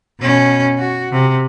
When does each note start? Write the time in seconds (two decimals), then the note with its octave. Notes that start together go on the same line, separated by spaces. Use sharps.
0.20 B2 C#4
0.78 F#4
1.12 C3